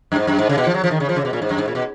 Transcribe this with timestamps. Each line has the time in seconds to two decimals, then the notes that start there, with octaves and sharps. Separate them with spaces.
0.12 F#2
0.16 G#2
0.27 F#2
0.38 G#2
0.49 C#3
0.58 B2
0.67 F3
0.74 F#3
0.84 F3
0.91 D#3
1.00 C#3
1.09 F3
1.16 C#3
1.25 B2
1.33 A#2
1.42 G#2
1.51 F#2
1.58 G#2
1.68 A#2
1.75 B2